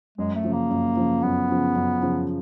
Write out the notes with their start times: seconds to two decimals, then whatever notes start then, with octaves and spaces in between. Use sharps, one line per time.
0.18 F#2 G#3
0.35 A3
0.44 C#3 F3
0.53 A#3
0.70 F#2
0.97 C#3 F3
1.22 F#2 B3
1.50 C#3 F3
1.75 F#2
2.02 C#3 F3